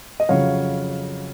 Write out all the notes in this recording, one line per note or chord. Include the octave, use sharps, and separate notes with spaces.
D#5
F2 C#3 F#3 C#5 F5